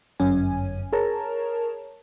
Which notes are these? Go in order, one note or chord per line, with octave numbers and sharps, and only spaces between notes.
G1 F#2 C#4 G#5
G#4 A#4 C#5 A5 A#5